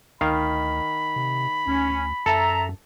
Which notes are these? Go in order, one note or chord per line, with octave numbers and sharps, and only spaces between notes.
D2 D#3 F5 B5
C3
D2 C#4
F#2 A4 E5 A5 A#5